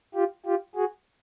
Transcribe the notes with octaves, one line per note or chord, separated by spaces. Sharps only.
F4 G4
F4 G4
F#4 G#4